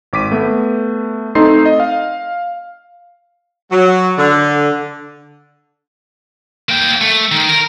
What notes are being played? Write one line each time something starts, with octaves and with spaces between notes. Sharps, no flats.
G#1 D6 B6 D#7
A3 B3
A3 C4 D#4 A4 C6 C7
D#5
F5
F#3
D3
A#3 G5
A3
D#3
A#4